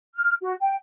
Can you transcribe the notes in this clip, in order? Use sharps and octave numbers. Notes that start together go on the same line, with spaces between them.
F6
F#4
G5